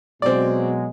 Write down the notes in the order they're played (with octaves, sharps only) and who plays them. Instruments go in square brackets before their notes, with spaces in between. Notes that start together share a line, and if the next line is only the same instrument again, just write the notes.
[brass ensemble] B2 F#3 G#3 [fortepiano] C4 D5